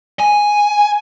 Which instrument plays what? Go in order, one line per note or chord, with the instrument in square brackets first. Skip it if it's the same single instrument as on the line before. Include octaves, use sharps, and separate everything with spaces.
[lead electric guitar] G#5